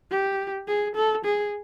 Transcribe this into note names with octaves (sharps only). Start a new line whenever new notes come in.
G4
G#4
A4
G#4